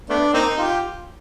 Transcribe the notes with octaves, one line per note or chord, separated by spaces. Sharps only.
A3 B3 D4
A#3 C4 D#4
F4 G4